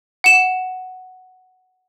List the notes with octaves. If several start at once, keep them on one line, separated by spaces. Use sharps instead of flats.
F#5 E7